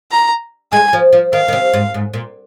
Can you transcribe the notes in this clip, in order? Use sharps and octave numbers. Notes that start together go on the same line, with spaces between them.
A#5
G#3 G#5
F3
F3
D#3 F5
D#3
C3
G#2
G#2
A#2